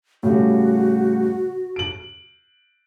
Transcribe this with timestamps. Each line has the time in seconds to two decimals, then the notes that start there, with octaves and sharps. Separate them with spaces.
0.23 A2 C#3 G3 F#4
1.76 D7 F#7